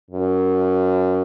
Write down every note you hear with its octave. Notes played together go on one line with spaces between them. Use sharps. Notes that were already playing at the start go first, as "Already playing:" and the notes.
F#2